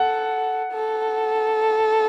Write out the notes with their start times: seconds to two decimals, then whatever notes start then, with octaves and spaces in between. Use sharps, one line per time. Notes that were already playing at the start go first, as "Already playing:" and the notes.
Already playing: A4 F#5
0.72 A4